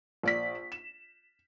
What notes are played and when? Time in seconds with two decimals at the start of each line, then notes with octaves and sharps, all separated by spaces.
0.23 A#1 D5 B6
0.72 E7